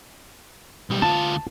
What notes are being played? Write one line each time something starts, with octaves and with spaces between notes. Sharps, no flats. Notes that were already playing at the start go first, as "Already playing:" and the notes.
B1 G3
D2 F4 A5